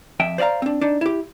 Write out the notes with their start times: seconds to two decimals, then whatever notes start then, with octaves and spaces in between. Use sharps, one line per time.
0.20 F2 E5 G5
0.38 C5 D5 D#5 F5 A#5
0.62 C4 D4
0.81 D4 D#4
1.01 E4 G4